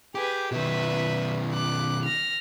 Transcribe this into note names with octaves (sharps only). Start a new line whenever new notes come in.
G4 G#4 B4
B2 D#3 B4 E5
D6 F#6
F6 A#6